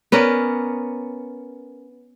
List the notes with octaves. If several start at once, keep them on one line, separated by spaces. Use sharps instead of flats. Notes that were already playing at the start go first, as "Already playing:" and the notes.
B3 C#4 A#4 D5